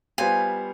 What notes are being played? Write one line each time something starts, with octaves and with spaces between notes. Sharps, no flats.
G3 B3 F4 C5 F5 G#5